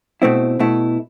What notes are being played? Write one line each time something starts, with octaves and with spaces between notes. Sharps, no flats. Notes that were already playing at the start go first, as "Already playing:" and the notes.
B2 A3 C4 E4
B2 A3 E4